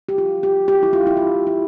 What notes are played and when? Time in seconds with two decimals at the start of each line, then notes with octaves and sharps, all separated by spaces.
0.09 G4
0.18 F4
0.43 G4
0.68 G4
0.83 E4
0.93 F4
1.07 E4
1.17 F4
1.47 E4